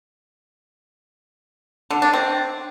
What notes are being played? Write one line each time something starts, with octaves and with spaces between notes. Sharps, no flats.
D3
D4
C4